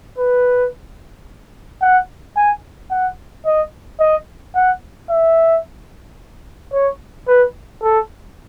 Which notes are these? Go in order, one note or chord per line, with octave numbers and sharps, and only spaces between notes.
B4
F#5
G#5
F#5
D#5
D#5
F#5
E5
C#5
B4
A4